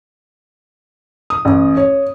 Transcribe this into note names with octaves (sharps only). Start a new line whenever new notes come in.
D#6
A1
C#5